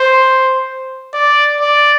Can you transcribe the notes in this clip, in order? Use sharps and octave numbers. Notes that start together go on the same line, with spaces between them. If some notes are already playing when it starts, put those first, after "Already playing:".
Already playing: C5
D5
D5